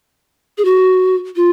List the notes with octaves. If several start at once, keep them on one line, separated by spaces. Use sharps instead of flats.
G#4
F#4
F4